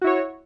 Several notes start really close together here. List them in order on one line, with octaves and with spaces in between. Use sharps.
F#4 E4 C#5